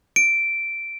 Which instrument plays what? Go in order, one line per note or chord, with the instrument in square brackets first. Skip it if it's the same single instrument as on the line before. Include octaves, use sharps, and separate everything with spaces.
[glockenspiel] D7